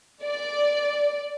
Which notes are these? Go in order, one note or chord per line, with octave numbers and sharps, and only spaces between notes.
D5